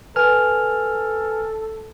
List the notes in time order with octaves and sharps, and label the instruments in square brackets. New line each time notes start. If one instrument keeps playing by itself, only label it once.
[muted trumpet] A4 [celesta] B4 [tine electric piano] G#5 F6